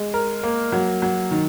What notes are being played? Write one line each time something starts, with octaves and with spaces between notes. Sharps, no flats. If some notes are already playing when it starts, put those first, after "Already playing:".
Already playing: G#3
A#4
A#3
F#3
F#3
D#3